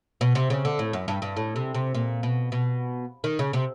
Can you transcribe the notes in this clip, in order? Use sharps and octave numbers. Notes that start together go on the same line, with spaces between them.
B2
C3
C#3
D3
A2
F#2
G2
G2
A2
C3
C3
A#2
B2
B2
D#3
C#3
C3